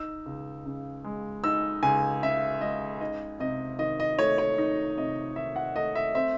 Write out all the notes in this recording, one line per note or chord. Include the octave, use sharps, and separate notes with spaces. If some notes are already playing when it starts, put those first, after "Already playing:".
Already playing: D#4 E6
C#2
C#3
G#3
D#4 E6
C#2 G#5
C#3 E5
G#3 D#5
D#4 D#5
C3 D#5
D#3 D#5
D#5
A3 C#5
C#5
D#4
C3 D#5
D#3 E5
F#5
A3 D#5
E5
C4 E5